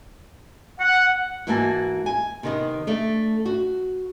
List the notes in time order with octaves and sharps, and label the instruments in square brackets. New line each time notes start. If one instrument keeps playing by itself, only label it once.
[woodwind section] F#5
[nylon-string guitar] G#2 E3 A#3 F#4 G#5 A5
G#5
C3 D#3 B3
A3 D4
F#4